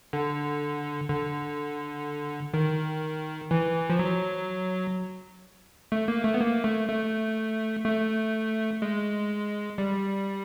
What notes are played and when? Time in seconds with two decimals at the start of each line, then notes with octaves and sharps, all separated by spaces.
0.13 D3
1.10 D3
2.54 D#3
3.51 E3
3.90 F3
3.99 F#3
5.92 A3
6.08 A#3
6.24 A3
6.34 B3
6.41 A#3
6.64 A3
6.89 A3
7.84 A3
8.82 G#3
9.78 G3